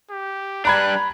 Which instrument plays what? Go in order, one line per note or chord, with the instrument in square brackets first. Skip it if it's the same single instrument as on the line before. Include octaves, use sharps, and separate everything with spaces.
[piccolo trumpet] G4
[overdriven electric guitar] G3 D4 [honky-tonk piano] A#5 B5 G#6 [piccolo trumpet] F#6